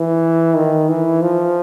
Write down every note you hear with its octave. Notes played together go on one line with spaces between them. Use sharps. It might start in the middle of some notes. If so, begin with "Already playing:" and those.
Already playing: E3
D#3
E3
F3